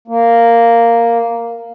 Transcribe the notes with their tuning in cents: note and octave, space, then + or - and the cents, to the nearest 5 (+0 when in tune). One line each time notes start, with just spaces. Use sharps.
A#3 -5